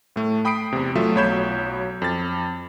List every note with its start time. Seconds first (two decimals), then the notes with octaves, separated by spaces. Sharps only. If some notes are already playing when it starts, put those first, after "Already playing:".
0.16 A2 A3
0.45 G5 B5 D#6 B6 C7 D7
0.73 E2 C3
0.95 F#3 A3 F4 E5
1.15 B1 F#3 C#5 B5 G6 E7
2.02 F2 A6